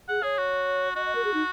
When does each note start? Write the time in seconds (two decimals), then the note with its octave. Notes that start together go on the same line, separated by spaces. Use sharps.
0.09 G#4 F#5
0.23 G#4 C#5
0.38 F#4
0.96 F#4 D#5
1.06 D#5
1.15 A#4
1.25 G#4
1.34 D#4